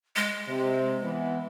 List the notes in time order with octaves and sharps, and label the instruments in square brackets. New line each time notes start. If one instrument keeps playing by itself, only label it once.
[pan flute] G#3
[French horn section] C3
E3 B3